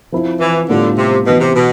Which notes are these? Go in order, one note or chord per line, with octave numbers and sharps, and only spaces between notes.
F3 C4 E4
E3
A2 D3 G3 B3 D4 F4
C3
B2 E3 B3 E4
C3
B2